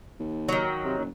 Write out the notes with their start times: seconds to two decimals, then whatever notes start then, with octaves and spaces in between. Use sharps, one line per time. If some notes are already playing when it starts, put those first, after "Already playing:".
0.20 D#2
0.49 D#3 F#3
0.84 C3
0.98 F#1